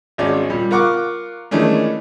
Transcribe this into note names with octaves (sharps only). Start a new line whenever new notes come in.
G#1 G#3 C#4 D5
A#2 G3
F4 A#4 F#5 C#6 D6
D#3 E3 G#3 A3 C#4 D4